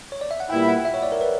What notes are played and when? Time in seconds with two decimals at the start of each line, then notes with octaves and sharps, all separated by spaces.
0.12 C#5
0.21 D5
0.31 E5
0.40 F#5
0.49 A#2 G3 B3 E4 G5
0.68 F#5
0.85 E5
0.94 C#5
1.02 D5
1.12 A#4
1.21 B4